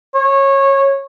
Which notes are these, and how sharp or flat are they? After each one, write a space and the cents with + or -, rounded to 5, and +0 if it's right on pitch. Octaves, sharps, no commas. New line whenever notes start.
C#5 -20